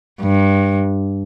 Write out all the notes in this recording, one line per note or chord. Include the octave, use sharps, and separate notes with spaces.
G2